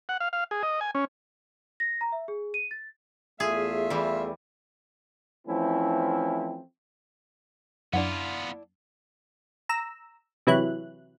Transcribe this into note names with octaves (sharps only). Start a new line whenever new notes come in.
F#5
F5
F5
G#4
D#5
G#5
C#4
A#6
A#5
E5
G#4
D#7
A6
E2 A3 F4 G#4 E5
E3 G3
E3 F3 A3 C4 C#4 E4
F#2 B3 D4 E4 F4 F#5
A#5 E6
C3 E3 F#3 E4 F#6